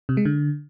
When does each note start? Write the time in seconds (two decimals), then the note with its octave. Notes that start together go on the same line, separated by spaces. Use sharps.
0.09 C3
0.17 G#3
0.25 D3